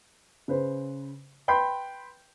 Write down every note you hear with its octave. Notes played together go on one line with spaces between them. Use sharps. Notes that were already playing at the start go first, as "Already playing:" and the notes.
C#3 B4 C5
B4 G5 B5 C6 G6